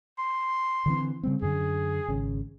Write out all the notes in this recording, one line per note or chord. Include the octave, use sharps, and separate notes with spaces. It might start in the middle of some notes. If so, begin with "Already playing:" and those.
C6
D3 E3 C4
C#3 G3 C4
F#2 D3 G#4
G#1 C#3